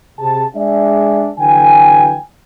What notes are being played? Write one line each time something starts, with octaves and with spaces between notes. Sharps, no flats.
C3 G#4 A5
G#3 D4 G#4 D5 E5
D3 E3 F#3 G5 G#5